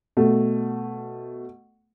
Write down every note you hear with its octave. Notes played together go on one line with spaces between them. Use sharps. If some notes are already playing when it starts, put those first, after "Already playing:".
B2 A3